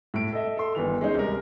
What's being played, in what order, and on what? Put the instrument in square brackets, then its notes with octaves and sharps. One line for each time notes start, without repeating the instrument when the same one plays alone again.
[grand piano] A2 D7
A4 D#5 E5
A4 C6
G1 D#3 E3 F7
G#3 C#4 D#4 C5
C2 A#4